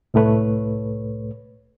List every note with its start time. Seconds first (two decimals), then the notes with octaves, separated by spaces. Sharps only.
0.14 C2 A2 A3 B4 C#5